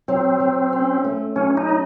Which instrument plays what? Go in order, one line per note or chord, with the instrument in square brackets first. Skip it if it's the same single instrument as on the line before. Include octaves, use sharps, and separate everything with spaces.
[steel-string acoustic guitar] F#3 [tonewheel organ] C4
[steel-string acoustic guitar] F#3
C#4
A3
[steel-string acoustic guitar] F#3 [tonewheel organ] C#4
[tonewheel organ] D#4
[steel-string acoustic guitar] C#4